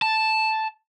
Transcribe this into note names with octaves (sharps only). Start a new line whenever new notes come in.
A5